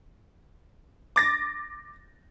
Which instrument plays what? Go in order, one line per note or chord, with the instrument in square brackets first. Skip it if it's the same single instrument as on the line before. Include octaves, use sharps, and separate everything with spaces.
[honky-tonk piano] D6 A6 A#6